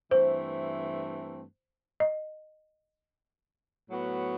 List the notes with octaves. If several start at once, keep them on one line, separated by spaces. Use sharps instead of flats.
G2 E3 A3 C4 C5
D#5
A2 F#3 B3 F#4